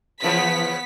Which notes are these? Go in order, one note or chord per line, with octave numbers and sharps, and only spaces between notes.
C#3 E3 F3 B3 B6